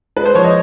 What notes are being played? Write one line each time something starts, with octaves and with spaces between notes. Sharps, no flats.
G#3 B4
C5
F3 C#5
D#5